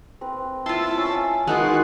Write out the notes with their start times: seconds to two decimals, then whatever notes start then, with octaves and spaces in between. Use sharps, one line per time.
0.21 C4 A#4 B4
0.66 E4 F4 A5 C6
0.97 A3 C#4
1.47 D#3 G#3 D#4 F4 F#4 G#4 B4 D#5